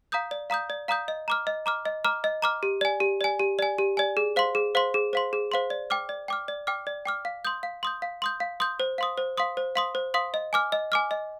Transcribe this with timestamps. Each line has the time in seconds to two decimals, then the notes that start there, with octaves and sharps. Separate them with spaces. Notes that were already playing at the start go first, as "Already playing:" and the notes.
0.12 F5 A#5 D#6 G6
0.31 D5
0.50 F5 A#5 D#6 G6
0.70 D5
0.88 F5 A#5 D#6 G6
1.08 D#5
1.28 A#5 D6 F6
1.47 D#5
1.66 A#5 D6 F6
1.85 D#5
2.05 A#5 D6 F6
2.24 D#5
2.42 A#5 D6 F6
2.63 G4
2.81 D5 G#5
3.00 G4
3.21 D5 G#5
3.39 G4
3.59 D5 G#5
3.78 G4
3.97 D5 G#5
4.17 G#4
4.36 C5 F5 C6
4.55 G#4
4.75 C5 F5 C6
4.94 G#4
5.13 C5 F5 C6
5.33 G#4
5.52 C5 F5 C6
5.70 D5
5.90 G5 D6 F6
6.09 D5
6.28 G5 D6 F6
6.48 D5
6.67 G5 D6 F6
6.87 D5
7.05 G5 D6 F6
7.25 F5
7.45 C6 D#6 G6
7.63 F5
7.83 C6 D#6 G6
8.02 F5
8.22 C6 D#6 G6
8.40 F5
8.60 C6 D#6 G6
8.80 C5
8.98 F5 C6 D#6
9.17 C5
9.37 F5 C6 D#6
9.57 C5
9.75 F5 C6 D#6
9.95 C5
10.14 F5 C6 D#6
10.34 D#5
10.53 G#5 D6 F6
10.72 D#5
10.92 G#5 D6 F6
11.11 D#5